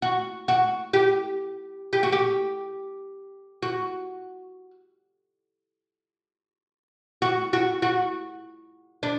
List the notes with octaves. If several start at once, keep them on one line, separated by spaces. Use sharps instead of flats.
F#4
F#4
G4
G4
F#4
G4
F#4
F#4
F#4
F#4
D4